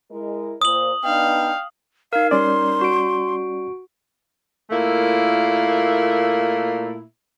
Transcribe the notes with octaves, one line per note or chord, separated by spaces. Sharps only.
G#3 E4 A#4
A#2 C5 D#6 F#7
B3 D4 D#4 F5 G5
D#4 A#4 F5
G3 C#4 D5 C6
F#4 D7
A#2 A3 A#3 E4